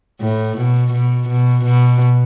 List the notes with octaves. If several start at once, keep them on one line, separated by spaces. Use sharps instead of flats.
A2
B2
B2
B2
B2